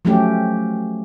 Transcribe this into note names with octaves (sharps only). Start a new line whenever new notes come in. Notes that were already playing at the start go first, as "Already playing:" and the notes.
F3 F#3 A3 C#4 G4